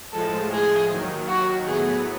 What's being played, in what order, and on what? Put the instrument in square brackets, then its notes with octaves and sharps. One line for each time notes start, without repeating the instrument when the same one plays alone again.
[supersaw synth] A2 F3 G#3 [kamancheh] A4
[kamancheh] G#4
[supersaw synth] D#2 D#3 F#3
[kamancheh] F#4
[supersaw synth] A2 F#3 B3 [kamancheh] G#4